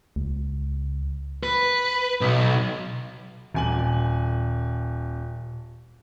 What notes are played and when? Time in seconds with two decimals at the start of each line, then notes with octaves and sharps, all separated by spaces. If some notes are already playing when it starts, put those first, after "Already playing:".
0.16 C#2
1.43 B4
2.21 B1
3.54 D#1 A#2 G#5 F#7